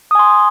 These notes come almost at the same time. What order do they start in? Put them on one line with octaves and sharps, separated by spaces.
D#6 G#5 C6